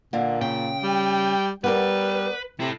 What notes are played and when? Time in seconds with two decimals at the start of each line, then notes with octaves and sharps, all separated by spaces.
0.13 A#2 D3 A#3
0.41 C#3 G5
0.83 G3
1.64 G3 B3 A#4 B4 D5
2.60 C3 E4 A4